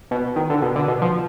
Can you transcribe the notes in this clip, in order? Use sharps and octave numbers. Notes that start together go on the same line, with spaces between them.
B2
D#3
D3
B2
D3
B2
F3